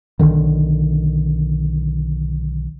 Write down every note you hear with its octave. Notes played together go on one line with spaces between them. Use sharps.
B1 B2 D3 D#3